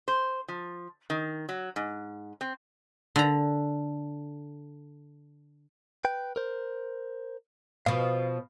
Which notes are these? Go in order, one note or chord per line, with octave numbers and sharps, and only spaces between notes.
C5
F3
D#3
F#3
G#2
C4
D3 A#5
B4 G5
A#4 C5
B2 F3 F5